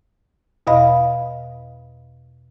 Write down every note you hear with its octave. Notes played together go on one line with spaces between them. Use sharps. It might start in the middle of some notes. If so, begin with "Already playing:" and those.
E2 B2 D#5 F5 B5